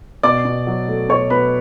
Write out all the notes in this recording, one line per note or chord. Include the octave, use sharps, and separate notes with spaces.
B2 D5 D6
B2
F#3
A3
B2 C#5 C#6
B2 B4 B5